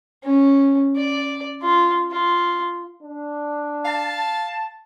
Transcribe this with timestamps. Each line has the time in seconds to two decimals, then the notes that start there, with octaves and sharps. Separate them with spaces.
0.24 C#4
0.97 D5
1.63 F4
2.12 F4
3.02 D4
3.85 F5 A5